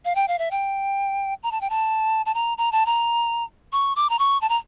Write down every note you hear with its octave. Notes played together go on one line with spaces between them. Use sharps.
F5
G5
F5
E5
G5
A#5
A5
G5
A5
A5
A#5
A#5
A5
A#5
C#6
D6
A#5
C#6
A5
A#5